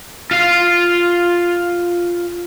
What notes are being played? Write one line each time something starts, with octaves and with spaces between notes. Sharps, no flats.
F4 F5